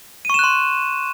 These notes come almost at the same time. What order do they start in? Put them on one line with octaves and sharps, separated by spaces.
D#7 C#6 E7 F#6 C6